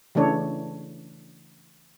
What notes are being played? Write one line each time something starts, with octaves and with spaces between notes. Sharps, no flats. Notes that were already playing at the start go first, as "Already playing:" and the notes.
C#3 E3 A3 D4 A4 C#5